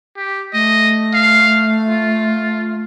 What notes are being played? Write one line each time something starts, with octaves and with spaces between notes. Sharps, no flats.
G4
A3 D#5
F5
F4